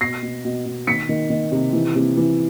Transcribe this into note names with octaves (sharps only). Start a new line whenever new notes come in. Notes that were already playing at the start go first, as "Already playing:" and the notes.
B2 A#6 C7
B2
B2
B2
D#3 B6 C#7
D#3
D#3
C3
E3
C3
E3